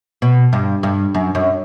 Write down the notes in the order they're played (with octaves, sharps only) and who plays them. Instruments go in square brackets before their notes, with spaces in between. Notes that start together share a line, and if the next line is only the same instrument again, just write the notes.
[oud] B2
G2
G2
F#2
F#2